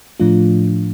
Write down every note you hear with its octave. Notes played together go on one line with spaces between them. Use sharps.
A2 F3 A3 D4 F4